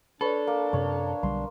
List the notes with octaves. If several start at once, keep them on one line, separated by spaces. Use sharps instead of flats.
D4 A4 B4 C#5
A#3
F#2 C3 C#5
B1 D3 G3 C6